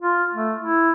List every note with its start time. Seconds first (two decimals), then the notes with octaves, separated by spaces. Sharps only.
0.02 F4
0.34 A3
0.59 E4